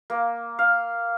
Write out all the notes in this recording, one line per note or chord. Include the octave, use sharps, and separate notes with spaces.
A#3
F5